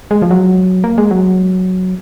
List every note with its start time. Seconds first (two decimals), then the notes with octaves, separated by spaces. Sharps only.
0.11 G#3
0.22 F3
0.31 F#3
0.84 A#3
0.98 G#3
1.11 F#3